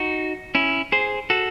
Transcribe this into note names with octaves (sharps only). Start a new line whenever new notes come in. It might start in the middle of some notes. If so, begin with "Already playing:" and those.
Already playing: D#4 F#4
C#4 E4
G#4 C5
F#4 A4